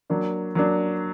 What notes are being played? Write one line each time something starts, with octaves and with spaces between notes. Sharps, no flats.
F#3 A#3 D4
F#3 A#3 D4